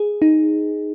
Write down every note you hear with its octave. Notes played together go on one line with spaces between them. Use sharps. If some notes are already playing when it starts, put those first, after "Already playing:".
Already playing: G#4
D#4